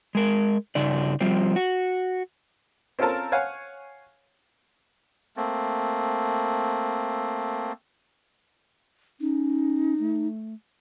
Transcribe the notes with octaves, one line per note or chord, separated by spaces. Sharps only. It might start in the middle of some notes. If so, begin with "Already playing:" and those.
G#3 A#4
G2 C#3 D#4 D5
F3 G3 C4
F#4
C4 C#4 F4 A4 A#4 A5
C#5 F5 F#5 G#5
A3 A#3 C4
C#4 D#4
A3